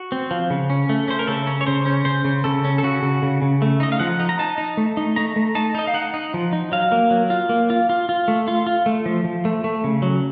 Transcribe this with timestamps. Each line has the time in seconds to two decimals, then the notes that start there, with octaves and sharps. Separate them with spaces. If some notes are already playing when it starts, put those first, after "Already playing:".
Already playing: F#4
0.12 C4
0.31 F3
0.50 C#3
0.70 C#4
0.89 A3
1.08 C#4 C5
1.19 A#4
1.27 C#3 A4
1.47 C#4
1.61 C#5
1.67 C#3 C5
1.86 C#4
2.05 C#3 C5
2.25 C#3
2.44 C#3 A4
2.64 C#4
2.78 A4
2.83 C#3 F#4
3.02 C#3
3.22 C#3
3.42 C#3
3.62 A3
3.80 D#4 D#5
3.92 F5
3.99 F3 F#5
4.20 D#4
4.29 A#5
4.39 D#4 A5
4.58 D#4
4.77 A3
4.97 D#4
5.16 A3 A#5
5.36 A3
5.55 D#4 A5
5.75 D#4 D#5
5.87 F5
5.94 D#4 F#5
6.14 D#4
6.34 F3
6.53 D#4
6.72 F#3 F5
6.92 A#3
7.11 F#3
7.30 F4
7.49 A#3
7.70 F4
7.89 F4
8.09 F4
8.28 A3
8.48 F4
8.67 F4
8.86 A3
9.06 F3
9.24 F3
9.45 A3
9.64 A3
9.84 C#3
10.02 F#3